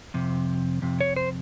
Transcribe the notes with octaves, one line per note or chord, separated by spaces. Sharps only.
F2 C3
F2 C3
C#5
C5